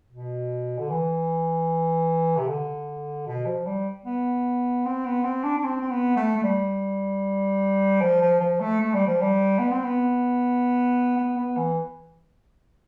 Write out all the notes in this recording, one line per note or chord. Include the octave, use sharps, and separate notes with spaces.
B2
D3
E3
C3
D3
B2
F3
G3
B3
C4
B3
C4
D4
D4
C4
C4
B3
A3
A3
G3
F3
F3
F3
A3
A3
G3
F3
G3
B3
C4
B3
B3
B3
E3